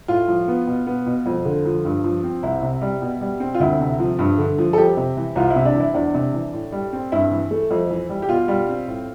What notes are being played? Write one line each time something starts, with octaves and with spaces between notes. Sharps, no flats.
A2 F4
F3
B3
B2
B3
B2
F2
D3
F3
G2
F3
C4
C2 E4
C3
G3
B2
G3
C4
F4
D2 E4
C3
F3
G2
D3
F3
A4
F2 G4
C3
E3
C2 F4
E4
C3
D4
E3
E4
E2 D4
C3
E3
A2
G3
C4
G2 E4
E3
A3
F2
E3
G3
G4
B2 F4
G3
C4
A2